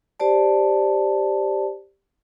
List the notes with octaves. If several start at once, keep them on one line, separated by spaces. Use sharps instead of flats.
G4 C5 D5 A5